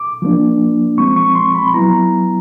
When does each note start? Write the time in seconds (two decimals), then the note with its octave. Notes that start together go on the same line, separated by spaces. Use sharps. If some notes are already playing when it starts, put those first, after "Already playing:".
Already playing: D6
0.22 F3 A#3 D4
0.98 F3 G#3 C4 C#6
1.16 C#6
1.35 C6
1.55 B5
1.74 F#3 B3 E4 A#5